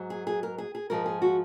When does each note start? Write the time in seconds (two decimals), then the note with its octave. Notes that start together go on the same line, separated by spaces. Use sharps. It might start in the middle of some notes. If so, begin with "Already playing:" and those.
Already playing: G#2 F#3
0.10 G#4
0.27 G#4
0.43 A#4
0.58 G#4
0.75 G#4
0.90 G#2 F3 G#3 A#4
1.06 G#4
1.22 F#4